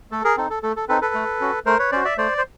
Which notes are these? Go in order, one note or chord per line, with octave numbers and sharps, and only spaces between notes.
A3 A4
G#4 A#4
C4 D#4 A4
A4
A3 A4
A4
C4 D#4 A4 B4
A4 B4
A3
C#4 F#4
A3 A#4 C5
B4 C#5
C#4 F#4 C5 D5
D5 E5
A3 C5 D5
C5